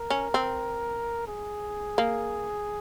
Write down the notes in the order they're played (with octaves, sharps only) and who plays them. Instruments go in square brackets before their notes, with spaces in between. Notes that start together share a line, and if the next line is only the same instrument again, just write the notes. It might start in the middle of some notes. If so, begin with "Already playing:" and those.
Already playing: [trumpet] A#4
[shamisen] C#4
C4
[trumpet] G#4
[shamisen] A#3